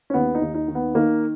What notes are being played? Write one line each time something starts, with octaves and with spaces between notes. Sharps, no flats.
C#4
D#2 B3
D#4
D#2
D#4
D#3
B3
D#3 A#3